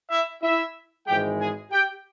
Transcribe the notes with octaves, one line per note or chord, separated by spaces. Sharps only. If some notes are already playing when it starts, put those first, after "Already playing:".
E4 E5
E4 E5
G#1 G#2 E3 G#3 G4 G5
G#4 G#5
G4 G5